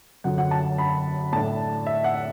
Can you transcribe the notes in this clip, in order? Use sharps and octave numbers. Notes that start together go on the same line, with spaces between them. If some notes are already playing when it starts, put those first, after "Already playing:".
F#2 D3 F#3 F#5
F#5
A5
B5
A2 A3 D4 A5
E5
F#5